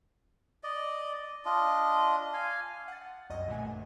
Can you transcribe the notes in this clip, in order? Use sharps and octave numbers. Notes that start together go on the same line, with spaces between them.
D5 D#5
D4 F4 D#5
F5 G#5
F#5 A6
C2 F#2 D#5
A#2 D3 A3 G#5
A1